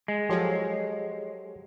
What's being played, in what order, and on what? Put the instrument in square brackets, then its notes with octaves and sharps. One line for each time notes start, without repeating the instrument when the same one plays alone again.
[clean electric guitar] G#3
[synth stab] F3 F#3 [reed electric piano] G4 A4 C#5